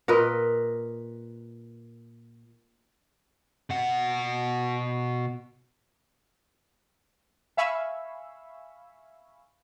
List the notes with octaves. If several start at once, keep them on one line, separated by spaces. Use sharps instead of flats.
A#2 A#4 B4 D#5
B2 F#5
E5 F5 G#5 B5 C#6 E6